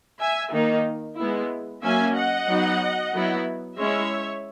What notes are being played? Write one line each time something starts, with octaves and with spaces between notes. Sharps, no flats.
E5 G#5
D#3 A#3 D#4
G#3 B3 E4
F#3 A#3 C#4 E5 G#5
D#5 F#5
F#3 B3 D#4
F#3 B3 E4
G#3 C#4 E4 C#5 E5